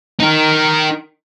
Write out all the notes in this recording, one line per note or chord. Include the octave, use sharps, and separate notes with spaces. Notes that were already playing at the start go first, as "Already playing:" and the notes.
D#4 A#4